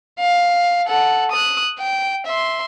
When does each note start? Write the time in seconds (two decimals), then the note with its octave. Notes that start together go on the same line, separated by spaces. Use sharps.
0.21 F5
0.86 A4 F#5
1.32 D#6 F#6
1.79 G5
2.27 E5 C6